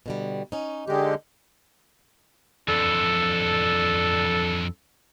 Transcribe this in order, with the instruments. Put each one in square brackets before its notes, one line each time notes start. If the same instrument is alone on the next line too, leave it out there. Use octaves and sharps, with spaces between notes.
[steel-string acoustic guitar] B2 D3 G3
C#4 D#4
[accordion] D3 G#3 G4 [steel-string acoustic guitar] D#4 A4
[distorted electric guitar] F2 E3 [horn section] D4 A4